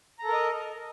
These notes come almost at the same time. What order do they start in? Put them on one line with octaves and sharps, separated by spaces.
A#5 A4 A#4 D#5